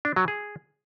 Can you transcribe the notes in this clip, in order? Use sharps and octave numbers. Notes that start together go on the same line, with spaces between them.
D4
F#3
G#4